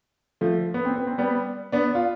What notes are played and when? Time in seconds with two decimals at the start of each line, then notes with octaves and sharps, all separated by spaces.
0.41 F3 A3
0.74 B3
0.85 C4
0.96 B3
1.07 C4
1.18 G3 B3
1.72 B3 D4
1.95 F4